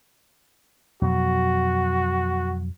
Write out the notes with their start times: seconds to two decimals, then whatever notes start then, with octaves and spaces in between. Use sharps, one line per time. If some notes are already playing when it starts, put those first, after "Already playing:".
1.02 F2 B2 F#3 F#4